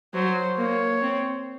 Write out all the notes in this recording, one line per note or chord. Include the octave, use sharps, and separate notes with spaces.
F#3 C5
A#3 C#5
C4